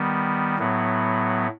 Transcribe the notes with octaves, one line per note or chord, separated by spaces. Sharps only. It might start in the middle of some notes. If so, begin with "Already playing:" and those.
Already playing: D#3 G3 B3
A2 F#3 B3